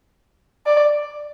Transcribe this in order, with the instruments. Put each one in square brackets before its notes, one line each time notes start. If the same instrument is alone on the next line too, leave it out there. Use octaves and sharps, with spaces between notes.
[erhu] D5